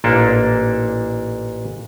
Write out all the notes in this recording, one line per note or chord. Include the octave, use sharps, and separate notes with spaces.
A1 A#2 A#3 D4 A4